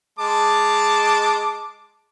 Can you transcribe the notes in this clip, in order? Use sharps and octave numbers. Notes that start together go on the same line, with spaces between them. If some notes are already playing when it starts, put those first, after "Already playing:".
G#3 A5 D6